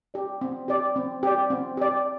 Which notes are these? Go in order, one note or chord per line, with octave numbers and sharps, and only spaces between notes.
G4 D5
C4
G4 D5
C4
G4 D5
C4
G4 D5